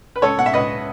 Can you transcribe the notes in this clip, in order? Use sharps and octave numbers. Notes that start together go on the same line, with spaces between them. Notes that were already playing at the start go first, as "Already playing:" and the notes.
B4
C#2 A4 C#5
B2 F#5
E5
C#2 B4 D#5